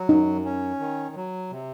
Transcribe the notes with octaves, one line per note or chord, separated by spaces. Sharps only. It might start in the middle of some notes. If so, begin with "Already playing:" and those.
Already playing: F#3
F#2 D#4
C#4
D#3
F#3
C3